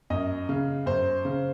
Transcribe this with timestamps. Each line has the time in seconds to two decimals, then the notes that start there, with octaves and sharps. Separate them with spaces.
0.10 F#2 D#5
0.49 C#3
0.86 F#2 C5
1.25 C#3